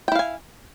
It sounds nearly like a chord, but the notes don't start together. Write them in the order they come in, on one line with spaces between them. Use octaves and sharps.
G5 E4 F5 G#5